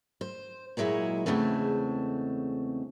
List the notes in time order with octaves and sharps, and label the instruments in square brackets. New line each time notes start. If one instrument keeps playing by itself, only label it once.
[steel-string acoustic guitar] C5
A#2 F#3 G#3 E4 C#5
E2 G#2 C#3 G#3 A3 C4